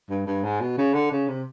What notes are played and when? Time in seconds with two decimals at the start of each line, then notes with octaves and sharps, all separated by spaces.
0.10 G2
0.27 G2
0.44 G#2
0.61 B2
0.78 C#3
0.94 D3
1.11 C#3
1.28 C3